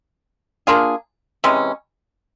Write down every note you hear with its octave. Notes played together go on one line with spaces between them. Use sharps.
A#3 D4 F4 G#4
C3 E3 G#3 C#4